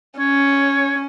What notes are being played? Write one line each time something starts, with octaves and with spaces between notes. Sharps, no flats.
C#4 C#5